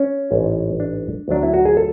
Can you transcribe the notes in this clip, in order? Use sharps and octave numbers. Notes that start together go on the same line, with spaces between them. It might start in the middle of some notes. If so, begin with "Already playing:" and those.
Already playing: C#4
A1 G#2 E3
D4
D2 D3 F#3 D4
E4
F#4
G#4
A4